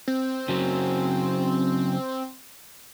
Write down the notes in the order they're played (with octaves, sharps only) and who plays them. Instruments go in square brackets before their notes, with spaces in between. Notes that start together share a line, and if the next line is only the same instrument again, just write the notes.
[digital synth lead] C4
[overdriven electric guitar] C#3 F#3